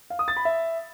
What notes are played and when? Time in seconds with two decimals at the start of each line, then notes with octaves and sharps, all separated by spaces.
0.10 F5
0.19 D#6
0.28 A6
0.37 B5
0.45 E5